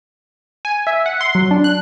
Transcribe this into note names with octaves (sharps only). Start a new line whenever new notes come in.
G#5
E5
F#5
C6
F#3
D4
F#6